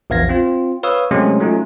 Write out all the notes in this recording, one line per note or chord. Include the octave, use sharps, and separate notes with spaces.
A#1 E2 F5 G#6 A#6
C4 F4
B4 C#5 F5 D#6 E6
C3 F#3 G#3 A3 C4 C#4
F#3 A3 C#4 D#4 F4